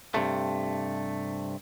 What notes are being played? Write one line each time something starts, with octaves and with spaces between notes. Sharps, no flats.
G2 C3 A3